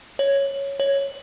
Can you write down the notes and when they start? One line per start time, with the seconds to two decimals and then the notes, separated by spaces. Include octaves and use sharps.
0.19 C#5
0.80 C#5